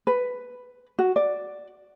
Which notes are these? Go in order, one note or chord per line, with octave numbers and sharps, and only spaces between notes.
B4
F#4
D5